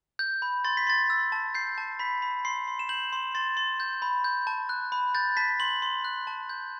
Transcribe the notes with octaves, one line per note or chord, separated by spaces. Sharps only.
G6
B5
C6 A6
B6
C6 A6
E6
A5
G6 C7
A5
B5 B6
B5
C6 C7
C6
E7
G6 F#7
C6
C6 A6
C6
G6
B5
G6
A5
F#6
B5
G6 A6
A5 B6
C6 F#7
C6
F#6
A5
G6